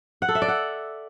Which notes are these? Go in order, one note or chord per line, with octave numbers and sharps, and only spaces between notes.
F#5
A4
E5
D5
F#5